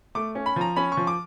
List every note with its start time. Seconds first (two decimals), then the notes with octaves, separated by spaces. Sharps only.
0.15 A3 D6
0.35 C#4
0.46 B5
0.56 F3 A#5
0.76 C#4 B5
0.92 C#6
0.97 F3
1.07 D6